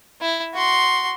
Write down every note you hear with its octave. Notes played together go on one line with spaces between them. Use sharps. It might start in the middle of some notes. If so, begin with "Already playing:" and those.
E4
F#4 C6